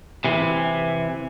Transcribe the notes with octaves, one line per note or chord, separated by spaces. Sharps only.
C3 E3